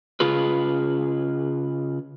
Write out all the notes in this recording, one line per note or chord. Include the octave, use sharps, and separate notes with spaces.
C#3 F4 G#4 B4